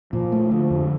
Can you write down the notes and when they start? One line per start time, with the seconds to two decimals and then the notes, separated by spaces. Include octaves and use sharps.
0.13 A#2 F3
0.32 A3
0.51 D3 F3
0.70 F2